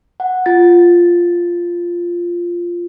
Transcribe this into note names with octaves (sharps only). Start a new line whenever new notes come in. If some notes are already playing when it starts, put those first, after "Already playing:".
F#5
F4 A6